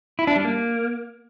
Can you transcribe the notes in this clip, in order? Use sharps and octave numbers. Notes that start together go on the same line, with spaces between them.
E4
D4
G3
A#3